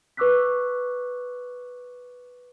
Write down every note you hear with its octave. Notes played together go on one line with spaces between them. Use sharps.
B4 C#6 D6 E6 F#6 B6